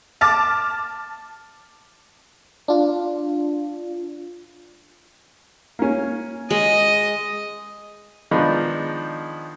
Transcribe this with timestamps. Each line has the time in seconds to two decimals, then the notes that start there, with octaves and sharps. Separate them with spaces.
0.21 A5 D6 F6 A6
2.68 D4 F4
5.79 A#3 C#4
6.50 G#3 D#5
8.31 D#3 F3 G#3 B3 D4 D#4